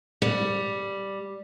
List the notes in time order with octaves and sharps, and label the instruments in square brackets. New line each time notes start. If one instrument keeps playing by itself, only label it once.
[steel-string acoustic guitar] G3